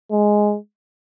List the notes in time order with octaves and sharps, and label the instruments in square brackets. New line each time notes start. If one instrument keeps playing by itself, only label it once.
[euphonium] G#3